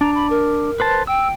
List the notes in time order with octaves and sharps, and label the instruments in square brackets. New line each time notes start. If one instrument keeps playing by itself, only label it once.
[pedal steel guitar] D4 [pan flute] A#5
[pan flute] B5
A#4
[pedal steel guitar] B4 C5 A5
[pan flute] G5 [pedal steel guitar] E6